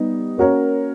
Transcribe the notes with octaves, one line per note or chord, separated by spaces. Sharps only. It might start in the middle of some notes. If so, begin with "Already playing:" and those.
Already playing: G3 B3 D#4
A#3 C#4 F#4 A#4 C#5